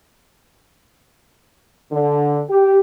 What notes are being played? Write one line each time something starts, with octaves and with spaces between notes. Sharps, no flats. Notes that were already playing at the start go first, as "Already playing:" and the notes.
D3
G4